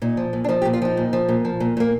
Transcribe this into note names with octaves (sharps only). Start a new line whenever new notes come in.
A#2 D#4
F3
A#2
D4
F3 D#4
G4
A#2
F4
F3 D#4
A#2
F3
A#2
F3
A#2
A#2 A#3